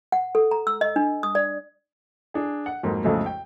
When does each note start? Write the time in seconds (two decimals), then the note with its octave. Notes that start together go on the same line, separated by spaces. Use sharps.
0.12 F#5
0.35 A4
0.51 A#5
0.67 E6
0.81 D#5
0.96 D4
1.23 D#6
1.35 D5
2.34 D4 G#4
2.66 F#5
2.83 F2 G#2 F#3 A#3
3.04 B1 F2 A2 C#3 G#3 A3
3.26 G5